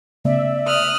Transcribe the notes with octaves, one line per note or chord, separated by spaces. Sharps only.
C#3 A3 B3 D5 E5
D#6 F6 F#6